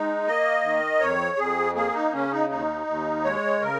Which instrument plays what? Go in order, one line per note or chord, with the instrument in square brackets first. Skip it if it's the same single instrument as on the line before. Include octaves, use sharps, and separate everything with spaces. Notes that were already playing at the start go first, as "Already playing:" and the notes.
Already playing: [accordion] G#3 D#4
A#3 D#5
D#3
F2 C#5
F2 G#4
A#3 G#4
D#4
C#3 C#4
D#4
D#2 D#4
D#2
G#3 C#5
C#3 A#4